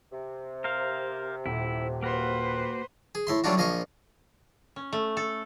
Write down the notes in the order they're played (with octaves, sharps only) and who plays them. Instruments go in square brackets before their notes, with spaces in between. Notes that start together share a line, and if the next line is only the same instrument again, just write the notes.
[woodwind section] C3
[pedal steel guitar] A#4 C5 F5
[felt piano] D#1 [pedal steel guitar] E4
[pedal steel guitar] A#3 F#4 [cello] B4 C5
[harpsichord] G#4
A2 E5 C6
F#3 G3 A3 D4 F4 F#4
A#1 F3 D#5 F5 G#5 C#6
[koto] C#4
A3
A4